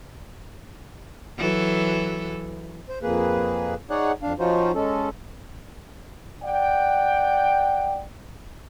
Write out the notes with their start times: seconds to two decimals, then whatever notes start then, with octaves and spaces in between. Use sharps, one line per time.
1.38 E3 F#3 A4
2.89 C5
3.02 F2 A#3 G#4 B4
3.90 D#4 G#4 C#5 D5 F#5
4.22 F2 D4 F5
4.39 F3 C#4 D#4 F4 F#4 C5
4.75 G#3 C#4 A4
6.44 D5 F#5 G5